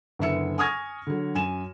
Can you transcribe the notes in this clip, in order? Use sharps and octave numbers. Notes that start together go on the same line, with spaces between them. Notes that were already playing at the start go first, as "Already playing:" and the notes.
F#1 D3 B3 E5 E6 C#7
G#5 C#6 D#6 F6 G#6 A#6
D3 F#3
F#2 G#5 E7